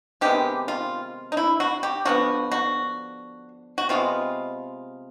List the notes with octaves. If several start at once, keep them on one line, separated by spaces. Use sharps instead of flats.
C3 D#3 G#3 B3 G4
F4
D#4
E4
F#4
G4
D3 F3 G#3 B3 F#4
F#4
F#4
C3 E3 G#3 B3 F4